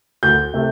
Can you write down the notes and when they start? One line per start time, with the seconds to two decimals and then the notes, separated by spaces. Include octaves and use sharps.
0.23 D2 G6
0.54 C3 A3